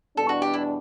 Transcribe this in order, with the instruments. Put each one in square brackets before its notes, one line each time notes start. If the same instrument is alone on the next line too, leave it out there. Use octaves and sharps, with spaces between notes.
[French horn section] E2 B2 G3 D4 [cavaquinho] A4
[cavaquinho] F#4
G4
E4